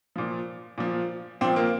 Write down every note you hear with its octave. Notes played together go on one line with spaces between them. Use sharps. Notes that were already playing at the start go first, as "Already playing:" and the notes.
A#2 F3
A#2 F3
A#2 F3 C4
A#3